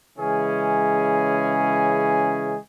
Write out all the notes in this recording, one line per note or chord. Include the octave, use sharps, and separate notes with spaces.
C#3 E3 G#3 C#4 G#4